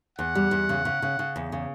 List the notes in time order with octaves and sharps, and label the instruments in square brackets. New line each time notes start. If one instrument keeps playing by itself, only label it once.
[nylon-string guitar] E2 [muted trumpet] F#5
[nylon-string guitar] G3
E2
C#3
C#3
C#3
C#3
E2
C#3